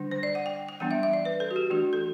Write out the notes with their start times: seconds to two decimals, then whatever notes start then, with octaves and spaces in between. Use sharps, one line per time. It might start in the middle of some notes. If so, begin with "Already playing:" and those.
Already playing: D3 G3 D4
0.11 C5
0.23 D5
0.35 F#5
0.46 G5
0.69 G5
0.80 E3 G3 B3 D4 F#5
0.91 E5
1.03 E5
1.13 D5
1.25 B4
1.40 A4
1.51 F#4
1.56 G4
1.70 E3 A3 D4 F#4
1.93 A4